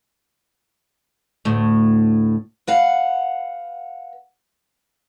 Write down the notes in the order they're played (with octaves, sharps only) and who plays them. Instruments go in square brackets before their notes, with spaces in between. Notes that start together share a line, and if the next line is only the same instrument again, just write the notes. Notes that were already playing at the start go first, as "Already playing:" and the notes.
[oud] D2 A2
[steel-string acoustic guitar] B4 F5 F#5